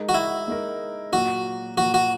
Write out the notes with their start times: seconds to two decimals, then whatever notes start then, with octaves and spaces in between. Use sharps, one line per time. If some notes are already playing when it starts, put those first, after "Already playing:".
Already playing: G#3 D#4 A#4
0.09 F#4
0.14 E4
0.48 G#3 D#4 A#4
1.12 A#2 F#3 A#3 F#4
1.78 A#2 F#3 A#3 F#4
1.94 F#4